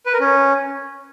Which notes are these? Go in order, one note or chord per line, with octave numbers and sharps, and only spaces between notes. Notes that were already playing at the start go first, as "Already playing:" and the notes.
B4
A#4
C#4